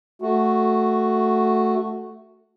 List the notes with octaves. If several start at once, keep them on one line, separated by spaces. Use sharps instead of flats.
A3 F#4